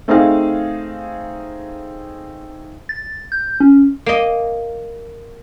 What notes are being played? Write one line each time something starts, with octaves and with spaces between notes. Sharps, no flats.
A3 C4 D#4 G#4 F5
A6
G6
C#4
A#3 D#5